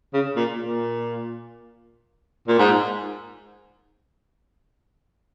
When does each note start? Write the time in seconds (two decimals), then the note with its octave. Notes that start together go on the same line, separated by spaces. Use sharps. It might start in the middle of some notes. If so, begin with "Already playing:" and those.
0.14 C#3
0.36 A#2
0.58 A#2
2.48 A#2
2.59 G#2